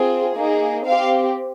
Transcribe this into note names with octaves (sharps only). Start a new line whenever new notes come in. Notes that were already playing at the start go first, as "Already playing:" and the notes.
Already playing: C4 F4 G#4
A#3 D#4 G#4
C4 G4 F5